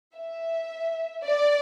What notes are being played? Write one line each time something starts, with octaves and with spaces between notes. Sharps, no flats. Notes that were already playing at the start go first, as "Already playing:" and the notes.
E5
D5